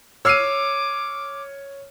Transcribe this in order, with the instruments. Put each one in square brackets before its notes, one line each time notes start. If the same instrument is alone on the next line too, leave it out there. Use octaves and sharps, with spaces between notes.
[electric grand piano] C#5 D#7 [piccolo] D6 [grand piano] E6 F6 C7